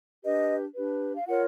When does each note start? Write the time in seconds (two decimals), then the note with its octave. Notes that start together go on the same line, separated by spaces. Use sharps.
0.23 D4 G4 B4 D#5
0.75 D4 G4 B4
1.15 F5
1.26 F4 A#4 C#5 F#5